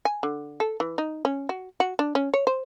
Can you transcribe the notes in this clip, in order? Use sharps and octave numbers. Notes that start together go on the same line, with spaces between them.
G#5
D3
A4
E3
D#4
C#4
F#4
F#4
D4
C#4
C#5
C5